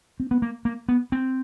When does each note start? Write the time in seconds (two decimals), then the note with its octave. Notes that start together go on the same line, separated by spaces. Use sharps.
0.20 C4
0.31 B3
0.42 A#3
0.65 A#3
0.89 B3
1.12 C4